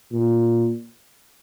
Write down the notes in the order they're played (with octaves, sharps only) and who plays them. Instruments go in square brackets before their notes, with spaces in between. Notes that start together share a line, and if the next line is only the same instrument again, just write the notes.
[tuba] A#2